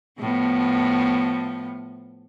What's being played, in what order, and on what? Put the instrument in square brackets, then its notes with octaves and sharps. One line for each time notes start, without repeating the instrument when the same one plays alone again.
[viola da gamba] A2 F3 B3